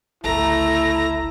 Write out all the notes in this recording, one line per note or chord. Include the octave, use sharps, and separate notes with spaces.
G1 C#2 A3 E4 A#5